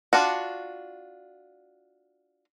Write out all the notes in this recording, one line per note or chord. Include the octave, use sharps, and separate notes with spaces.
D4 F4 F#4